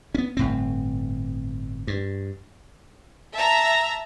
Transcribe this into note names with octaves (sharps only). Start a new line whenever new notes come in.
B3 C#4
G1 A2 C4
G2
E5 A5 A#5